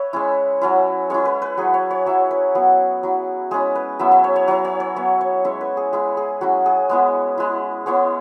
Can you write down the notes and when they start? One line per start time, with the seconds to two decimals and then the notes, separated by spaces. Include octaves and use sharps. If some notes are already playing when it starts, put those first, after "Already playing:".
Already playing: B4 C#5 E5
0.13 G#3 C#4 E4
0.61 F#3 C#4 E4
1.10 G#3 C#4 E4 C#5
1.25 B4
1.42 B4
1.57 F#3 E4 G#4
1.74 C#5
1.91 C#5
2.06 F#3 E4 E5
2.31 B4
2.55 F#3 B3 E4
3.03 F#3 E4
3.51 G#3 C#4 E4 G#4
3.75 B4
3.99 F#3 B3 E4 E5
4.12 E5
4.24 C#5
4.36 C#5
4.48 F#3 E4 C#5
4.65 C#5
4.80 C#5
4.96 F#3 B3 E4 E5
5.21 C#5
5.44 G#3 C#4 E4 E5
5.61 B4
5.77 G#4
5.93 G#3 E4 G#4
6.17 G#4
6.41 F#3 C#4 E4 F#4
6.66 G#4
6.89 G#3 B3 E4
7.38 G#3 E4
7.86 G#3 B3 E4 C#5